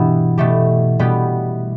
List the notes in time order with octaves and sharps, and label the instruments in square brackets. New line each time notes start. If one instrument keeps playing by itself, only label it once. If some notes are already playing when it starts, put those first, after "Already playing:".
Already playing: [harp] G2 B2 E3 B3 E4 G4
B2 A3 G4
B2 G3 B3 G4